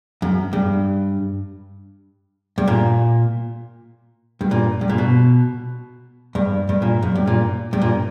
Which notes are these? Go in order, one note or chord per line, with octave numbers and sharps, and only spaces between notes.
F#2
G2
G2
A#2
G2
A#2
G2
A#2
B2
G2
G2
A#2
F#2
G2
A#2
G2
A#2